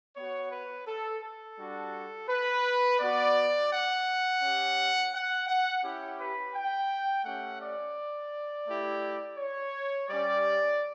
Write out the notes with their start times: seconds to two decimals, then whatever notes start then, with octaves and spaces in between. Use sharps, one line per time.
0.15 B3 F#4 C#5
0.51 B4
0.86 A4
1.22 A4
1.58 G3 D4 F#4
2.29 B4
2.99 B3 F#4 D5
3.71 F#5
4.42 C#4 G4
5.13 F#5
5.48 F#5
5.83 C#4 E4 G4
6.19 B4
6.54 G5
7.25 A3 C#4 G4 F#5
7.60 D5
8.67 A3 E4 G4
9.38 C#5
10.08 G3 C#4 G4 D5